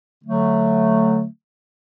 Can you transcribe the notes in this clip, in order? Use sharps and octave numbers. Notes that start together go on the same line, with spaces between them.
D3 F#3 A3